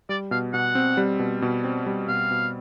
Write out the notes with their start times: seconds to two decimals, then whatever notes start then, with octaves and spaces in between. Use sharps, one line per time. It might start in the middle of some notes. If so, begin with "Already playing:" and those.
0.09 G3 D5
0.31 B2 F5
0.54 B2 F#5
0.75 C4
0.97 G3
1.19 B2
1.42 B2
1.64 C4
1.86 G3
2.08 B2 F5
2.31 B2